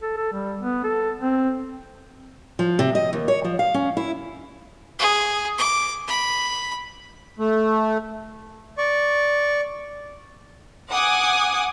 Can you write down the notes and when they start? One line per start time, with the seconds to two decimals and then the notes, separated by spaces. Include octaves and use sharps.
0.02 A4
0.17 A4
0.33 G3
0.61 B3
0.84 A4
1.19 C4
2.59 F3
2.79 C3
2.95 D#5
3.13 D#2
3.28 C#5
3.45 F3
3.59 F5
3.74 C#4
3.97 E4
4.99 G#4
5.58 D6
6.08 B5
7.39 A3
8.78 D5 C#6
10.91 F#5 G#5 D6 D#6